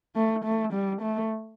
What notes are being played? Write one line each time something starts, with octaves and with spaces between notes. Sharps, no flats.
A3
A3
G3
A3